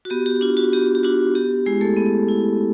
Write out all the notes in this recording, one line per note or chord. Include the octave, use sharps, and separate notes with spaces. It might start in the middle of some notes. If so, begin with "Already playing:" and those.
F#4
B3 G4
G4
D4 F4
F#4
B3 G4
G4
D4 F4 F#4
B3 G4
G#3 E4 G#4
A3 A4
B3
E4